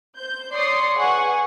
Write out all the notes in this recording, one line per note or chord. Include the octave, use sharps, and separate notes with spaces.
C5 G6
C#5 D5 C6 D#6 C7 C#7
G#4 B4 F#5 G#5 C#6